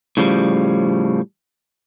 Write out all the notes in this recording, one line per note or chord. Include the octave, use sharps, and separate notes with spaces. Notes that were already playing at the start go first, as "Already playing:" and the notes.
A2 C#3 F3 G3